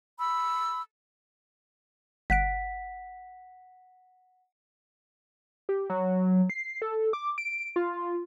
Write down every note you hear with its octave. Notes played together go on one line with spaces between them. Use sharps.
B5 E6
G1 F#5 F#6 B6 D7
G4
F#3
C7
A4
D6
D7
F4